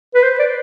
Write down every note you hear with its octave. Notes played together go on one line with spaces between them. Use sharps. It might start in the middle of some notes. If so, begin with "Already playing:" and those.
B4
C5
D5